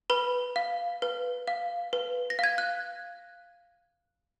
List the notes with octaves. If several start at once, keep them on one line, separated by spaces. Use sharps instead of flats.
B4 B5
F5
B4
F5
B4
A#6
F5 G#6
F#6